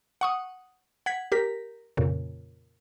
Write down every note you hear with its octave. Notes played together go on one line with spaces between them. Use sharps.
F#5 C#6 D#6
F#5 G#6 B6
G4 A#4 B6
F2 A#2 C#3